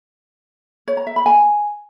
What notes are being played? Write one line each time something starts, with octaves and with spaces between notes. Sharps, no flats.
C#5
A#5
E5
B5
G#5